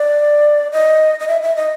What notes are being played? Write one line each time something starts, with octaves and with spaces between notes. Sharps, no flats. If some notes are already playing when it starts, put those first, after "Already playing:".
Already playing: D5
D#5
D#5
E5
E5
D#5